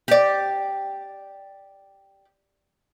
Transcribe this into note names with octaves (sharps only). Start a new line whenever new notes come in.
G4 D5